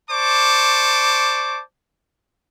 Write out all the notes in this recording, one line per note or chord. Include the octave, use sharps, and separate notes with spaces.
C5 D5 A5 C#6 D6